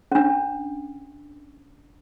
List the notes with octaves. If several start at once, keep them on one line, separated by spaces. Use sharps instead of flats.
C#4 D4